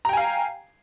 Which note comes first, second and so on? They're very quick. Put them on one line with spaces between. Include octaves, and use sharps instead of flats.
A#5 G5 G#5 F5